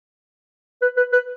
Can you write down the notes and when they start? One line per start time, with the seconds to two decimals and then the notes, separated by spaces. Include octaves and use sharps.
0.82 B4
0.97 B4
1.12 B4